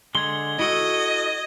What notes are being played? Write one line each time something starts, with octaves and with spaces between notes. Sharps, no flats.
D3 G#3 C6 G#6 G7
E4 F#4 A4 D#5